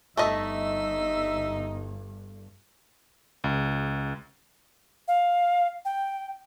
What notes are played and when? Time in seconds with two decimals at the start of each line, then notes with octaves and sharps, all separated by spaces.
0.17 G1 G2 A3 D#4 A4 D#5 E5
3.44 C#2
5.08 F5
5.85 G5